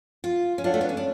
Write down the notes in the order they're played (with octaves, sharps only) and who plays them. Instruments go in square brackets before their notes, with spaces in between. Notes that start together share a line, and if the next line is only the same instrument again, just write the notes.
[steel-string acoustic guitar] F4
C#4
[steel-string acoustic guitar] D4 [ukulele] F4 A4 C#5 F#5
[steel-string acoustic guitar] A3
B3
C#4
D4